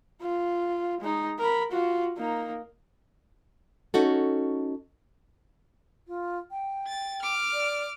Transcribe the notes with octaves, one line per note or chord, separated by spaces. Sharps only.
F4
G#3 D#4
A#4 B5
F4 F#4
A#3 D#4
C#4 D#4 F#4 A4
F4
G5
A6
D6 F6
D5